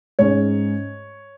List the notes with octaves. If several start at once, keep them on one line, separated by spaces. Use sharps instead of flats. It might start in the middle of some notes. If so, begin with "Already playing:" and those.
G#2 G#3 C#4 C#5